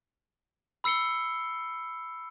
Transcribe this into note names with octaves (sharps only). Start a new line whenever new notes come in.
B5 E6 C7 C#7 G7